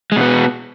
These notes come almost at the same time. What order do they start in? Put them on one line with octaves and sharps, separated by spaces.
G#3 B2 B3